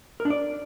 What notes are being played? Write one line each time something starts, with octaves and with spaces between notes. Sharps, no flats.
A#4
D4
D5